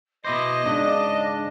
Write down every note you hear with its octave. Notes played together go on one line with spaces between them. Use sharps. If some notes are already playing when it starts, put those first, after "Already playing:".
B2 E4 C5 D#5 D6
G#2 C#3 D4